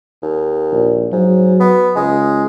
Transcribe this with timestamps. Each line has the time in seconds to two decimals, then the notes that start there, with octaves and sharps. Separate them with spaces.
0.23 D#2
0.72 A#1
1.12 G#2 F#3
1.60 B3
1.96 C#2 G#3